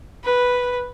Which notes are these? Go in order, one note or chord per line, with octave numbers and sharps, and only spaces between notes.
B4